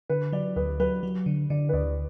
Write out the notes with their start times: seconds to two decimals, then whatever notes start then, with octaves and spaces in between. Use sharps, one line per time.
0.09 D3 B4
0.33 F#3 D5
0.56 D2 B4
0.80 F#3 B4
1.03 F#3
1.26 D3
1.50 D3 D5
1.69 B4
1.73 D2 D5